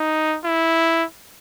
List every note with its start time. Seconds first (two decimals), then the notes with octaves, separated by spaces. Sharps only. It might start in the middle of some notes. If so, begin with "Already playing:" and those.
Already playing: D#4
0.44 E4